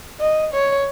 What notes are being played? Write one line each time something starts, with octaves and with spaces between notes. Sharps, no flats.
D#5
C#5